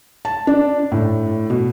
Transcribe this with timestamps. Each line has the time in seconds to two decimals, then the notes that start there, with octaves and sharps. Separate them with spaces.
0.25 A5
0.47 D4
0.92 A2
1.50 B2